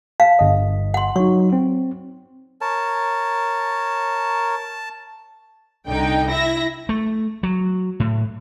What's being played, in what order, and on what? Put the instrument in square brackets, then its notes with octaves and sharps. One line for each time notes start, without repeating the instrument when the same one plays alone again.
[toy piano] F5 [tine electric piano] A5
[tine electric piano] G1 D#5
[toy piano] F#5 C6
[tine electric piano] F#3 D#4 [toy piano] C#6
[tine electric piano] C4
[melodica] A#4 C#5 [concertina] A5
[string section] C2 D3 D#4 G5
E4 E5 A#6
[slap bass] A3
F#3
A2